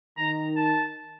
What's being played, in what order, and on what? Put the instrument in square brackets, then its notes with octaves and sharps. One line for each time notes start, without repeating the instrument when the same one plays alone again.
[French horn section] D#3 [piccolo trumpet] A#5
[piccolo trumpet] A5